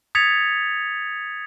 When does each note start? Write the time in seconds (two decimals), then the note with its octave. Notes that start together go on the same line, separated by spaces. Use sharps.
0.15 D#6 G#6 A6 B6 C#7 F7